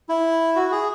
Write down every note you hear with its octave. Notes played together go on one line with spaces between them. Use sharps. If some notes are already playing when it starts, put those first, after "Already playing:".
E4
F#4
G#4